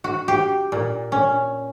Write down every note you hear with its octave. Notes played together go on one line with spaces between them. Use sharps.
F#4
G4
A#2
C#4